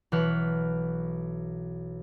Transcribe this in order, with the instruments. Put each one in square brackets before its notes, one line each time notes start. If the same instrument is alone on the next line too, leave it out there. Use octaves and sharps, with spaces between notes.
[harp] B1 E3 F#4 F#5 B5 F6